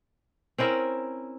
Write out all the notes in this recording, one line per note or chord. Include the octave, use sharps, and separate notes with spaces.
C4 C#4 E4 A#4